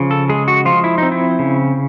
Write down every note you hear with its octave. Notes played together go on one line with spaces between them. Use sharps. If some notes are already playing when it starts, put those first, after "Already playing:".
Already playing: C#3 F3
A4
G#3 G#4
F#4
F3 F4
E4
C4 D#4
E4
C#3